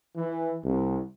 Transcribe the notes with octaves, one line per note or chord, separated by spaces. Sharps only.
E3
C2